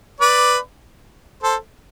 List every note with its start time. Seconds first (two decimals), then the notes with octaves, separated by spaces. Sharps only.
0.20 B4 D5
1.43 A4 C5